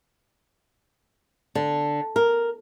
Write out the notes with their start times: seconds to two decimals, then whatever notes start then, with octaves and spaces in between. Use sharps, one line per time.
1.55 D3
2.16 A#4